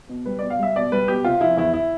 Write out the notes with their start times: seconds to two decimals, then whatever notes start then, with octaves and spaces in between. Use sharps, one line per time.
0.09 B2
0.26 G3 B4
0.39 B2 D5
0.50 F5
0.59 G3 E5
0.76 B2 D5
0.92 G3 B4
1.08 B2 G4
1.24 C3 F4
1.41 F3 E4
1.57 E2 E4
1.73 E4